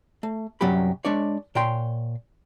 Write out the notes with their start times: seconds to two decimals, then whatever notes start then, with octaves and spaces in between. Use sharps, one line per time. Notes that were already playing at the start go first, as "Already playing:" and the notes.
0.23 A3
0.61 C2 F#2 F#3 C#4 G4 B5
1.05 G#3 D4 C#5 D5
1.55 A#2 C#5 G5 C6